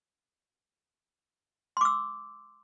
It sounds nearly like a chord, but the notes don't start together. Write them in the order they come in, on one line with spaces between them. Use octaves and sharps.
C6 D6 E6